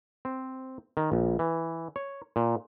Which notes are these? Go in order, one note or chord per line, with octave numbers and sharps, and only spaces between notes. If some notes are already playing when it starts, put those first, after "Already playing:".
C4
D#3
A#1
E3
C#5
A#2